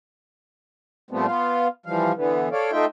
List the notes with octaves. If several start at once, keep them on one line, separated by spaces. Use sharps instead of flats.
A#2 F3 G3 A3 B3 C4
B3 F4 F5
E3 F3 G3 F5
D3 E3 B3
A4 C#5 D5 F5
A3 D#4 F4 E5 G5